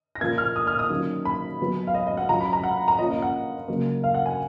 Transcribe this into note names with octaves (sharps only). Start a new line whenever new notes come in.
A#6
A#2 F3 A#3 G#6
F6
D#6
F6
D#6
D#3 F#3 C#4 F4
B5
F#3 B3 F4
F5
D#5
D#5
F#5
F#3 C#4 F4 A#5
B5
A#5
F#5
A#5
F3 A#3 C#4 F4 D#5
D#5
F#5
C#3 F#3 A#3
F5
F#5
G#5